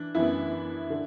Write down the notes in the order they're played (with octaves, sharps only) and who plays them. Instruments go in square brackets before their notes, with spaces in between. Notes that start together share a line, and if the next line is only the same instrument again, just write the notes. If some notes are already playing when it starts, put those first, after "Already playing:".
Already playing: [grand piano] E3 [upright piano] D4
[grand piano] F#2 E3 B3 [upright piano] E4
[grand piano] D3